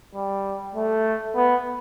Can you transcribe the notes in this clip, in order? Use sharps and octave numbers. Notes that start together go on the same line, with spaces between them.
G3
A3
B3